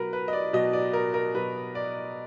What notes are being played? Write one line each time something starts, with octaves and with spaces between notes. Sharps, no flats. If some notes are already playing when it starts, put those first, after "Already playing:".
Already playing: B2 F#3 A#4 B4
B4
D#5
D5
B2 F#3 D#5
D5
A#4
A#4
B2 F#3 B4
D5